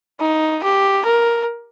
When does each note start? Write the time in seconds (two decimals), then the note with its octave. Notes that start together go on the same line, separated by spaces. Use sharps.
0.20 D#4
0.63 G4
1.05 A#4